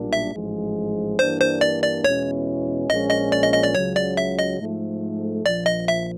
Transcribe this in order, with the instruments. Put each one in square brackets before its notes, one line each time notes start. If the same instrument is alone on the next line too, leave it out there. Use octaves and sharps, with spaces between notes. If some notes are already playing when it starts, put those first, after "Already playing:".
Already playing: [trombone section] B1 A#2 G3 A#3 D4
[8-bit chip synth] E5
[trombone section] A1 G#2 F3 G#3
[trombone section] G2 E3 G3 A#3 D4 [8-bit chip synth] C5
[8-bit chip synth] C5
D5
D5
[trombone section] E2 B2 G#3 C#4 E4 [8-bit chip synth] C#5
[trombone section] A#1 A#2 F3 G#3 C#4 [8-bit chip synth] D#5
[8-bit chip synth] D#5
D5
D#5
D#5
D5
[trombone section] C#2 C#3 F#3 [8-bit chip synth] C#5
[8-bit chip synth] D5
E5
D#5
[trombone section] G#2 F3 A3
[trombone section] A#1 A#2 F3 [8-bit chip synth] D5
[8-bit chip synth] D#5
E5